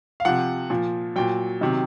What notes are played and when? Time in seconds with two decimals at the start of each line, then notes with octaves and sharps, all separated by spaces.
0.20 F5
0.25 C3 F3 F#5
0.70 A#2 F3
1.16 A#2 F#3 G5
1.61 C3 D#3 F#3